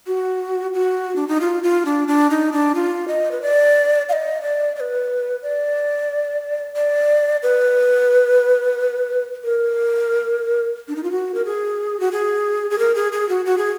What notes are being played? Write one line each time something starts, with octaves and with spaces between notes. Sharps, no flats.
F#4
F#4
D4
D#4
F4
F4
D4
D4
D#4
D4
F4
D#5
B4
D5
F5
D#5
D5
D5
B4
D5
D5
B4
A#4
D4
D#4
F4
F#4
A#4
G#4
F#4
G#4
G#4
A#4
G#4
G#4
F#4
F#4
G#4